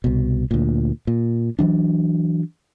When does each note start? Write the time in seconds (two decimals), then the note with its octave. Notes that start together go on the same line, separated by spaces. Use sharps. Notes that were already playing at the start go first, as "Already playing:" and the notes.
0.04 C2 B2
0.51 D2 A#2
1.07 A#2
1.59 E3 F#3 D4